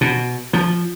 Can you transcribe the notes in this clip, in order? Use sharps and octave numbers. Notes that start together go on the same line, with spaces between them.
B2
F3